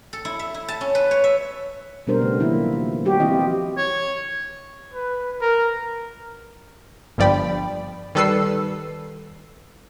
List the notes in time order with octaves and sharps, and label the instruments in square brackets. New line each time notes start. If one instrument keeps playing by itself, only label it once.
[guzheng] A4
E4
E5
E4
A5
C#4
B4
C#5
E5
[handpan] B2 G3 B3 D4 A#4 C5
C#3 A3
D#3 F3 F#3 A#3 E4
F3
G3 F#4 G4
E3 F3 C4 E4 F4 D#5
[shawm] C#5
[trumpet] B4
A#4
[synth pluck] G1 G2 F3 D5 G5 B5
D#3 G3 A4 B4 E6 C7